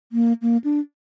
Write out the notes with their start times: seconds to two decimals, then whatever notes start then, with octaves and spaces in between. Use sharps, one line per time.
0.12 A#3
0.42 A#3
0.64 D4